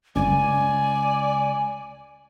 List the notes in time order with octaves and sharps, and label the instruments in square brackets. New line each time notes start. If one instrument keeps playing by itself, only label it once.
[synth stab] G1 [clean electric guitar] C#2 [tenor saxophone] D5 [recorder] G#5